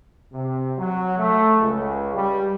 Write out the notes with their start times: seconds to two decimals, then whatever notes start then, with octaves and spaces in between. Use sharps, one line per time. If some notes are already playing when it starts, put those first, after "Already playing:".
0.33 C3
0.78 F#3
1.18 A3
1.60 C#2
2.14 G3